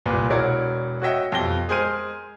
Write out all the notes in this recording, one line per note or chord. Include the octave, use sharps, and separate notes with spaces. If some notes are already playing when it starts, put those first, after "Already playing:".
C2 A#2 B4
E1 E4 F#4 A#4 C#5 D5
F#4 C#5 D#5 E5 G5
F2 B2 G4 A#6 G7
G#3 G#4 A#4 C5 F6 D#7